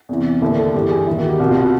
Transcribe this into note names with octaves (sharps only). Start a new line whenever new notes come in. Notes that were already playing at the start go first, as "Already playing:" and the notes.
E2 C3 E3
D#2 D3 E4
A4
G2 E3 G4
G#4
D#2 D#3 E4
F#4
G4
C2 B2 F#4
F4
F#4